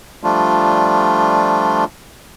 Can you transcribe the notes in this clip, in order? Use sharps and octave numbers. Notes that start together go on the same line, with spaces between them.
F3 G3 A3 D4 F4